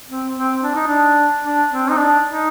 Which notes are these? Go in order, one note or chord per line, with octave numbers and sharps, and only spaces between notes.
C4
C4
D4
D#4
D4
D4
C4
D#4
D4
D#4